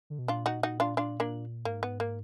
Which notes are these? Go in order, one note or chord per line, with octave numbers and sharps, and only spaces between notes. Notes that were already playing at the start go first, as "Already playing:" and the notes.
D3
B2
A#2 D4 F4
D#4 F#4
D#4 F#4
D4 F4
D4 F4
A#3 D4
G#2 A#3
B3
A#3